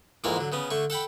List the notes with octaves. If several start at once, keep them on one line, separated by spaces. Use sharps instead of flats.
F2 G#2 E3 A#3 C#5 D5
D3 F#3
C#3 B3 C#4
D3 A3 C#6
A4 F#5 G5 B5